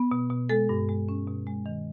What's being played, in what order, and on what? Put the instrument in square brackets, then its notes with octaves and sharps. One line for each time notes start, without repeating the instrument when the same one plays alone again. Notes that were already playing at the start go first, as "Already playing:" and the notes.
Already playing: [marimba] B3
B2
B2
G#3 A4
G2
G#3
C#4
B2
G#3
D#3